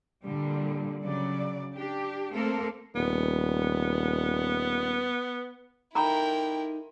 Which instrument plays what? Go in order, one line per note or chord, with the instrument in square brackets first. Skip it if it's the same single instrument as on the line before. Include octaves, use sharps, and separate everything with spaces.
[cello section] A#2 D3 G3
C#3 F#3 D5
D4 G4
A3 A#3 C4 A4 A#4
[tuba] D#1 [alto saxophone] B3
[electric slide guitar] D#4 A4 [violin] E4 A#4 [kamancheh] G5 [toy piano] A#5 B5